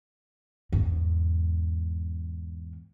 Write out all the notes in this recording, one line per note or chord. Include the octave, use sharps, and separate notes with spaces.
E2 G#2